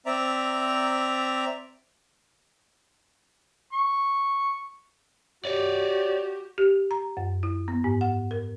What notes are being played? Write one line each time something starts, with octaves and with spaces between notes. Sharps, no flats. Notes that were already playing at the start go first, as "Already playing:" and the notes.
C4 D5 E5 A#5
C#6
F#4 G4 C#5 D5
G4
A#5
F#2
E4
B3
G#2
F#5
A#4